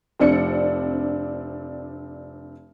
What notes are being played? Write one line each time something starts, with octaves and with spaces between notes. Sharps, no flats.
F1 C4 D4 C#7